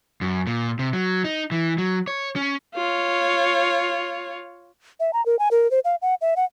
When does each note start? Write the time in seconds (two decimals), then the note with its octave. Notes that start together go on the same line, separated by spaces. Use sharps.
0.21 F#2
0.47 A#2
0.79 C3
0.93 F#3
1.24 D#4
1.51 E3
1.78 F#3
2.08 C#5
2.36 C#4
2.76 F4 C#5
5.00 E5
5.13 A#5
5.26 A#4
5.39 G#5
5.51 A#4
5.71 C5
5.85 F5
6.02 F#5
6.21 E5
6.36 F#5